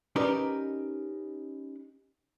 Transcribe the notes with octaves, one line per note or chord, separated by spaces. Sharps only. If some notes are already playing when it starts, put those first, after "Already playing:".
C#4 D#4 G4 A#4 B4 D5